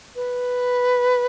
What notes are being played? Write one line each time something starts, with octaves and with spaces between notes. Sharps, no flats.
B4